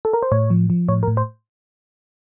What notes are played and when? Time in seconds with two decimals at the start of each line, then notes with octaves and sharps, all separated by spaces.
0.05 A4
0.13 A#4
0.23 C5
0.32 A2 C#5
0.50 F3
0.70 F3
0.89 A2 C#5
1.03 A#4
1.08 A2
1.17 C5